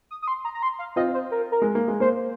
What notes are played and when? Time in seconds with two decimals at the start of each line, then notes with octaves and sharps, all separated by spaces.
0.11 D#6
0.22 D#6
0.28 C6
0.44 A#5
0.54 A#5
0.63 C6
0.79 F5
0.96 C4 F4 D#5
1.14 C5
1.31 A#4
1.52 A#4
1.62 G#3
1.75 A#3
1.88 G#3
2.00 A#3 C5